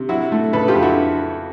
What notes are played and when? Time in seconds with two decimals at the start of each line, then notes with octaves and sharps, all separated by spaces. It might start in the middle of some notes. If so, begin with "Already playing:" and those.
Already playing: C3
0.09 F#3 E4 F#4
0.32 A3
0.53 C#3 A4 B4
0.68 F4 G4
0.75 F2
0.82 E4 F#4